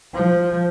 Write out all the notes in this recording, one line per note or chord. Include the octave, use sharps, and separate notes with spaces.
F3